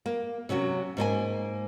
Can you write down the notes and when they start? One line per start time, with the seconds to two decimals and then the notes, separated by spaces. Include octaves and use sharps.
0.06 A#3
0.49 C3 F#3 C#4 F#4
0.97 G#2 A#3 C5 G#5